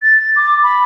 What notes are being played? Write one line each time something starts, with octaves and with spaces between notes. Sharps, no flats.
A6
D6
B5